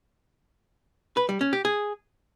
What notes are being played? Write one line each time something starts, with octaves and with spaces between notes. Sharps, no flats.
B4
G3
C#4
G4
G#4